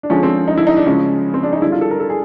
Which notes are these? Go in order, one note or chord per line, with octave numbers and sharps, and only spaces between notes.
D4
D3 F3 G#3 C#4
C4
D#4
E4
D#4
D4
C#3 F3 G#3 C#4
C4
D4
D#4
D3 G3 E4
F4
A4
A#4
A4
G#4